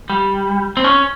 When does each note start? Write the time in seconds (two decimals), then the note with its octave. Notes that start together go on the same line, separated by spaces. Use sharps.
0.10 G3
0.77 C4
0.84 C#4